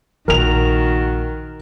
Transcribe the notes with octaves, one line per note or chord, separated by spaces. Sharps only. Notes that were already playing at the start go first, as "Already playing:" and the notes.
A#1 D#3 E4 F#4 A#4 F7